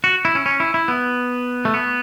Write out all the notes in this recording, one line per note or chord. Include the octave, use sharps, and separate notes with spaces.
F#4
E4
C#4
C#4
E4
E4
B3
A3
B3